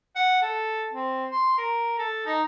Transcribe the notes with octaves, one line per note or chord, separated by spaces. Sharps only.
F#5
A4
C4
C6
A#4
A4
D#4